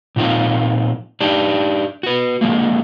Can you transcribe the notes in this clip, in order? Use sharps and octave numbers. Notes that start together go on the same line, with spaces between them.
A#2 F3 C4 D#4 F4
D4 D#4 G4
F#4 B4
D3 F3 G#3 A#3